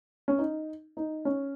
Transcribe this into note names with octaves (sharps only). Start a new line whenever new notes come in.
C#4
D#4
D#4
C#4